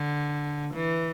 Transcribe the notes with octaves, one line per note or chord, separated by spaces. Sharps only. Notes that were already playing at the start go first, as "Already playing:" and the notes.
Already playing: D3
E3